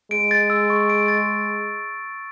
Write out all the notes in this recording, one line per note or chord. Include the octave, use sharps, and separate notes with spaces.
G#3 D7
A6
E6
C#6
D7
A6